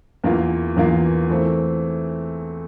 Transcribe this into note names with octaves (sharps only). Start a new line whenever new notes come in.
E2 E3 A#3 F4
E2 E3 A#3 F4
E3 A3 C4